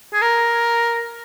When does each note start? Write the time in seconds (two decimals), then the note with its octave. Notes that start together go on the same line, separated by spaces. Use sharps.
0.13 G#4
0.22 A#4